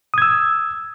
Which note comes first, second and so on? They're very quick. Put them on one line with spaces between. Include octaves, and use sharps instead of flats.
D#6 G#6 E6